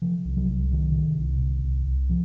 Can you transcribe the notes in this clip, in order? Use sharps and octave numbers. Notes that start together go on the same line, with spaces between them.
C3 F3
C2
F#3
C2
C3 D#3
C3
C2
C3
C2
C2
C3 F3